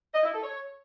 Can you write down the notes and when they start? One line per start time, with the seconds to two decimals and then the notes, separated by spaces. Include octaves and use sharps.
0.14 D#5
0.23 E4
0.33 A4
0.42 C#5